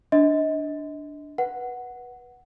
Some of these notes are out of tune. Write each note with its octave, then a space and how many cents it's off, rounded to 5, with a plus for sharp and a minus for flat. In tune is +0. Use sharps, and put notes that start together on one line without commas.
D4 +0 D#5 +30 C6 -30
B4 -20 F#5 +0